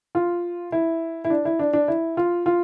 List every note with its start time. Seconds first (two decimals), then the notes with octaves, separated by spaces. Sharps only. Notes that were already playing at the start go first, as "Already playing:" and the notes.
0.15 F4
0.72 E4
1.25 E4
1.30 D4
1.45 E4
1.59 D4
1.73 D4
1.88 E4
2.17 F4
2.46 F4